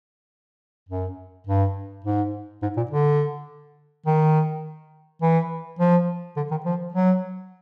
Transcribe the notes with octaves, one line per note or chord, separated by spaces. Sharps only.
F#2
G2
G#2
G#2
A#2
D3
D#3
E3
F3
D3
D#3
F3
F#3